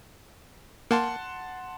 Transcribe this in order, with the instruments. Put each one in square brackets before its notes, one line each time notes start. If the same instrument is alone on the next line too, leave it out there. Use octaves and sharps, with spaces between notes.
[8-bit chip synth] A#3 [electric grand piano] F#5 A5 C6